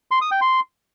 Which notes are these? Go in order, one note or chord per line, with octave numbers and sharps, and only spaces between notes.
C6
D#6
G5
C6